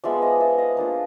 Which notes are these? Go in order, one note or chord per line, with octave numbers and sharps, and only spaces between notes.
F3 G#3 B3 D5 E5
D#5 F5
D5 E5
D#5 F5
A#3 D4 F4